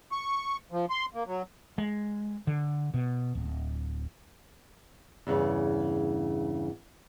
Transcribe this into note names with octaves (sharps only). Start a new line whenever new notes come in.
C#6
F3
C6
A#3
F#3
G#3
D3
B2
D1
E2 G2 C#3